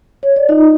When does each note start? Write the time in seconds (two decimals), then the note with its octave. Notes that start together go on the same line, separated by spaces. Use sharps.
0.23 C#5
0.36 D5
0.49 D#4 F4 D#5